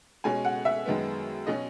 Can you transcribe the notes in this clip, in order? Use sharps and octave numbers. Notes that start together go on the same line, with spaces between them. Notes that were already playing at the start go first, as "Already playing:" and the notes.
B2 G#3 C#4 G#5
F#5
E5
F#2 D#3 G#3 B3
B2 F#3 C#4 D#5